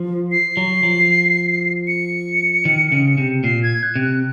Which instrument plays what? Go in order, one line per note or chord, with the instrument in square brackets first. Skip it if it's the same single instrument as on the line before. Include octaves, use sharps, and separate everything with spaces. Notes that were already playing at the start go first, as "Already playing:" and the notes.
Already playing: [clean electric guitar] F3
[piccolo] C7
[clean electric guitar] F#3
F3
[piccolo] C#7
[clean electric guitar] D#3
C#3
C3
[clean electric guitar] A#2 [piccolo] C7
[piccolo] G#6
F#6
[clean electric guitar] C3
[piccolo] F#6